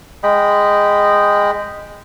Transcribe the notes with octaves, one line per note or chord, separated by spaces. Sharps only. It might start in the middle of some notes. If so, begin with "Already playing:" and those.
G#3 D#5 G5 B5